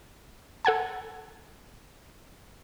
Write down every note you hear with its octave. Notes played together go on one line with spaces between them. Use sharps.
A4 F#5 G#5 A5